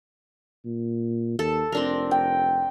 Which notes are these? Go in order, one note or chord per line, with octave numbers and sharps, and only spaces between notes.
A#2
D#2 A4
F1 C4 D4 A#4
G5